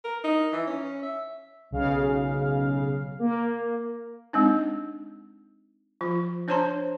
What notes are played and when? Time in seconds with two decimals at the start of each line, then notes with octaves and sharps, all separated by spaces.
0.04 A#4
0.24 D#4
0.52 E3
0.67 C#4
1.03 E5
1.71 B1 C#3 F5
3.19 A#3
4.33 G#3 C4 D4 D#4
6.01 F3 F4
6.48 D4 C5 C#5 A5 A#5 C6